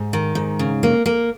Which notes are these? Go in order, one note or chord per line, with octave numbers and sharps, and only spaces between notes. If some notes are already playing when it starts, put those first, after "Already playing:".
Already playing: G#2
D#3
G#2
C#3
A#3
A#3